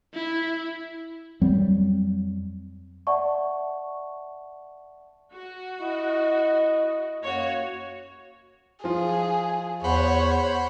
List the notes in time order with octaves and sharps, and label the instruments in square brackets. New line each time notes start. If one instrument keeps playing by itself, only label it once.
[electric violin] E4
[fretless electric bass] F2 F#3 G3 C4
[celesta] D5 E5 F#5 A5 C#6
[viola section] F#4
[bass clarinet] E4 [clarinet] D#5
[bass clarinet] F#2 [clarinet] A#3 [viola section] F#4 C#5
[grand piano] F3 F4 [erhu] G#4
[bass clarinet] E2 [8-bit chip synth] C5 F#5 B5 [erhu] C#5